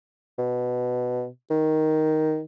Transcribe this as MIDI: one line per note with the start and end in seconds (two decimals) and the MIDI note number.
0.38 1.28 47
1.50 2.42 51